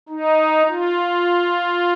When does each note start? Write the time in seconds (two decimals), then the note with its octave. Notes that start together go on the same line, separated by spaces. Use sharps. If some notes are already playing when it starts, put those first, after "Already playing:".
0.09 D#4
0.69 F4